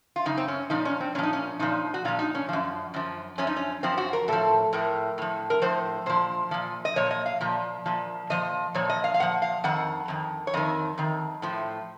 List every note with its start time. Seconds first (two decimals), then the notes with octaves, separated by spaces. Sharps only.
0.16 F4
0.26 F#2 C#3 D#4
0.37 C4
0.48 C#4
0.70 A#2 F3 D#4
0.85 C#4
1.00 C4
1.15 A#2 C#4
1.18 F3 D#4
1.33 C#4
1.59 A#2 F3 D#4
1.94 F#4
2.05 A#2 F3 F4
2.19 D#4
2.35 C#4
2.49 F#2 F3
2.94 F#2 F3
3.38 F#2 F3 C#4
3.47 D#4
3.56 C#4
3.83 F#2 F3 C4
3.98 F#4
4.13 A#4
4.28 A2 F3 A4
4.73 A2 F3 A#4
5.18 A2 F3
5.50 A#4
5.62 A2 F3 C5
6.06 A#2 F3 C5
6.51 A#2 F3
6.85 D#5
6.96 A#2 F3 C#5
7.11 D#5
7.26 F5
7.41 A#2 F3
7.86 A#2 F3
8.30 A#2 F3 D#5
8.75 A#2 F3 C#5
8.89 D#5
9.04 F5
9.14 F5
9.20 A#2 F3 F#5
9.42 F5
9.64 F2 D#3 F#5
10.08 F2 D#3
10.47 C#5
10.54 F2 D#3 D#5
10.98 F2 D#3
11.42 A2 F3